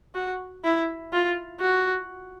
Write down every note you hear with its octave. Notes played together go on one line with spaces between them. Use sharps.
F#4
E4
F4
F#4